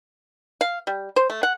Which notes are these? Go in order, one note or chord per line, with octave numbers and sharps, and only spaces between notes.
F5
G3
C5
A3
F#5